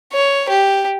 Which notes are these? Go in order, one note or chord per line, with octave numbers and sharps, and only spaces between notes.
C#5
G4